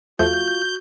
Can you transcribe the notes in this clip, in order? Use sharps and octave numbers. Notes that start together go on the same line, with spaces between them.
E2 F3 A3 F4 F#4 G6